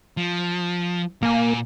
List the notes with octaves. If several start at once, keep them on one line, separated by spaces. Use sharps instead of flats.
F3
A#2 A#3 G#5